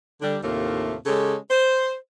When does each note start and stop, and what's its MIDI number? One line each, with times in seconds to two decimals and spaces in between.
0.22 0.36 50
0.22 0.36 55
0.22 0.36 62
0.43 0.94 39
0.43 0.94 45
0.43 0.94 48
0.43 0.94 57
0.43 0.94 58
0.43 0.94 65
1.06 1.36 49
1.06 1.36 56
1.06 1.36 61
1.06 1.36 67
1.06 1.36 69
1.50 1.94 72